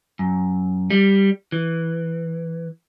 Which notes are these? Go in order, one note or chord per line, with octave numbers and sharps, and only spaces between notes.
F#2
G3
E3